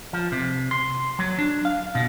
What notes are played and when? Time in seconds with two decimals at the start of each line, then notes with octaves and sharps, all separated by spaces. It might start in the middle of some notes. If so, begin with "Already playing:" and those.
0.13 F3
0.32 C3
0.71 C6
1.19 F#3
1.39 D4
1.65 F5
1.95 B2